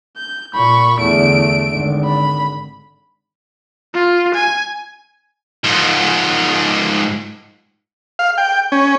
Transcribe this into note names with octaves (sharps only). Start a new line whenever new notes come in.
G6
A#2 B5 C#6
E2 D3 A3 D7
G#1 D3
B5
F4
G#5
G#2 F3
F5
G5
C#4